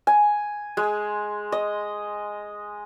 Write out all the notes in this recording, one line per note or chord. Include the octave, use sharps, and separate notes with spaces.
G#5
G#3
D#5